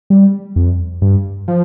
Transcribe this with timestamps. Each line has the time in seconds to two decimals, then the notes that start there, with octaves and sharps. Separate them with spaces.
0.10 G3
0.56 F2
1.02 G2
1.48 F3